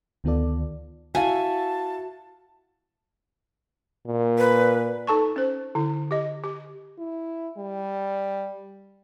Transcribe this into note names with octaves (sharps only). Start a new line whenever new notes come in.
D2 D#3 B3 F4 A4 D5
E4 F#4 E5 F5 G#5 A5
A#2
B4
D#4 A4 A5 C#6
C#4 C5
D3 E4
G4 D#5
G4
E4
G3